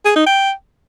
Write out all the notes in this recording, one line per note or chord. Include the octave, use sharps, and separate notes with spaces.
G#4
D#4
G5